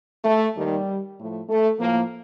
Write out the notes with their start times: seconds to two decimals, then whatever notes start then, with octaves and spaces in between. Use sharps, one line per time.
0.24 A3
0.55 D#2 D#3 G3
1.17 A2 F3 A3
1.48 A3
1.79 A2 F3 A#3